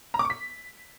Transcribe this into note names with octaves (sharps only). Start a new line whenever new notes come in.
A#5
D6
C#6
B6